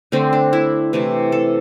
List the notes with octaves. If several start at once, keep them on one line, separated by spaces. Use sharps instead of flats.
D3 A3 C4
D4
E4
C3 E3 A3
A4